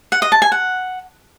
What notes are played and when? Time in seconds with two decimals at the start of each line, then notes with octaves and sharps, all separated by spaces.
0.12 F#5
0.22 D#5
0.32 A5
0.42 G#5
0.52 F#5